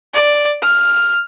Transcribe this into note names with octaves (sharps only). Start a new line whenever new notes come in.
D5
F6